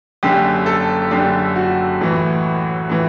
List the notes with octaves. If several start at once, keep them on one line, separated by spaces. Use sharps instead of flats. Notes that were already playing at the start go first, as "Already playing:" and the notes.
F#1 F#2 D3 G4
A4
F#1 F#2 D3 G4
F#4
A1 A2 E3
A2 E3